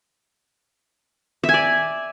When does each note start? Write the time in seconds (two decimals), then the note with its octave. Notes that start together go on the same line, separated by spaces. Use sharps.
1.44 E5
1.49 G#5
1.54 D5